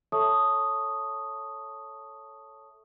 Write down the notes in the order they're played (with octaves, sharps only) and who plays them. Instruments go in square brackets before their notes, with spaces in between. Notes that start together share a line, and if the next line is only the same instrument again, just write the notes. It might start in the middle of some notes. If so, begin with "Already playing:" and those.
[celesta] A4 C#5 E5 A5 C#6 D#6